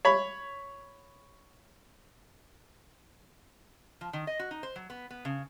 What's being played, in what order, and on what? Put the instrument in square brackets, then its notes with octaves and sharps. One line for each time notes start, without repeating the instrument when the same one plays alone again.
[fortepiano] C#5 B5
[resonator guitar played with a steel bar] F3
D#3
D#5
F#4
D#4
C5
F#3
B3
B3
C#3